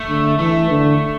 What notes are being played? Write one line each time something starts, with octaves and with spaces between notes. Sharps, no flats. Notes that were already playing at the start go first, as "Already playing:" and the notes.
Already playing: A3
D3
E3 A3
D3